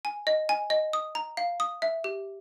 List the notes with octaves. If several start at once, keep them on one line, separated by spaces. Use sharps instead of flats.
G#5
D#5
G#5
D#5
D#6
A#5
F5
D#6
E5
G4